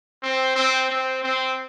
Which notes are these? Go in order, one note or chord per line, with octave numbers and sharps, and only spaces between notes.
C4
C4
C4
C4